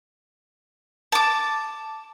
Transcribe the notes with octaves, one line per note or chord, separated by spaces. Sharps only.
A5 D6